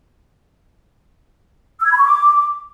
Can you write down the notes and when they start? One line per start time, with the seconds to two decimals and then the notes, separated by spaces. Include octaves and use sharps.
1.79 E6
1.85 G#6
1.92 B5
1.98 C#6
2.04 D6